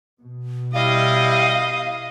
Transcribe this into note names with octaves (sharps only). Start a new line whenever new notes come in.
B2
G3 E4 D#5 F5